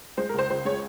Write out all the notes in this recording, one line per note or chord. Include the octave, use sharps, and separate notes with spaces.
G#3 C5
A#4
C#2 C5
C#2 C5
G#3 C#5